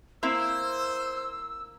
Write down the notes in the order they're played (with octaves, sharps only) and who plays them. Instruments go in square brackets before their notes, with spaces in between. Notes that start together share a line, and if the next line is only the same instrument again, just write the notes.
[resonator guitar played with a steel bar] A#3 C4 E4 [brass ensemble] C5 [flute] E6